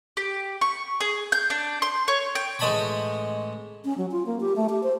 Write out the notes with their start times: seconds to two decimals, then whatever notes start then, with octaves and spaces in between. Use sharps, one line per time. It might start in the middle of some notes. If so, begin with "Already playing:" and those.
0.17 G4
0.61 C#6
1.01 G#4
1.32 G6
1.50 D4
1.82 C6
2.08 C#5
2.35 G5
2.59 A1 G#3 D#5 A5 B5 C#6
3.85 C#4
3.98 F#3
4.11 F4
4.26 A#3
4.41 G4
4.56 A3
4.70 G4
4.83 C5